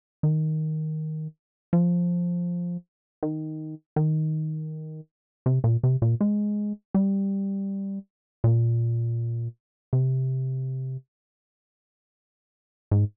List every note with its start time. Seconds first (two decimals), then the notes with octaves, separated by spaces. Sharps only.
0.23 D#3
1.73 F3
3.23 D#3
3.96 D#3
5.46 C3
5.64 A#2
5.83 C3
6.02 A#2
6.21 G#3
6.94 G3
8.44 A#2
9.93 C3
12.91 G#2